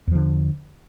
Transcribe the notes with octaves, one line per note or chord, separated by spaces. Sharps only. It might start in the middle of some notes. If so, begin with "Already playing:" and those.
E2 D3 F3